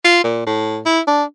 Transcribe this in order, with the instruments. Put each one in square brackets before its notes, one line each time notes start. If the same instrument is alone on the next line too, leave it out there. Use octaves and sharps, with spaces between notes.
[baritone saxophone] F4
A#2
A2
E4
D4